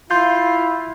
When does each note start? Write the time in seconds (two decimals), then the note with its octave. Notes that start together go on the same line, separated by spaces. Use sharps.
0.11 E4 F4 C6 G6